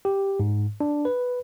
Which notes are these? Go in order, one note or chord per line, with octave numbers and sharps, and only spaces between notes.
G4
G#2
D4
B4